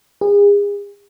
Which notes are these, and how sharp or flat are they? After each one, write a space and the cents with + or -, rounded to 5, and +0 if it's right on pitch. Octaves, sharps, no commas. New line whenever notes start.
G#4 -35